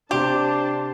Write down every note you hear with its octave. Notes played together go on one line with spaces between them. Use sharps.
C3 D4 G4 C5 A5 C6